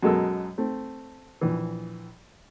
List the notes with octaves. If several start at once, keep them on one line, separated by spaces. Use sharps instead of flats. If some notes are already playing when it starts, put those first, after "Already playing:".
F#2 B2 G#3 A4 A#4 E6
A3 C4
A#1 E3